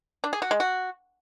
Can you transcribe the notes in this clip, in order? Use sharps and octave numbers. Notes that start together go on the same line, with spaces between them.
D4
G#4
F#4
G#3
F#4